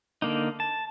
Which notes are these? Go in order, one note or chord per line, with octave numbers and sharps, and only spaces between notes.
D3 A#3 D#4
A5